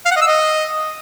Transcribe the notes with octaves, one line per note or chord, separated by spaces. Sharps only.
F5
F#5
D#5
E6
D#5